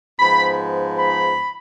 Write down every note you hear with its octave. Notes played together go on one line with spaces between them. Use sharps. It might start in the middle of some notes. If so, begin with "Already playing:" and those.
G#2 F3 B3 B5
B5